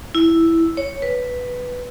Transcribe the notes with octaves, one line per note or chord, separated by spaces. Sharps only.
E4
C#5
B4